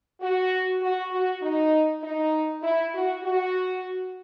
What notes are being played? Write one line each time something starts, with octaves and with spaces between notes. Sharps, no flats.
F#4
F#4
F#4
D#4
D#4
E4
F#4
F#4